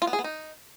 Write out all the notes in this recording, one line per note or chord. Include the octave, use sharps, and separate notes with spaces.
F4
B3
G#4
B3
D#4